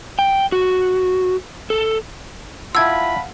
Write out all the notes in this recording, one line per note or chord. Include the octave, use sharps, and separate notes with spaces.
G5
F#4
A4
E4 F4 F5 F#5 A5 B5 E6 G#6